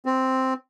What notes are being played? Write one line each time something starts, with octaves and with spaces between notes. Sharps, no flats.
C4